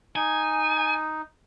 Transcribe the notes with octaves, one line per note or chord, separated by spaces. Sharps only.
D#4 G#5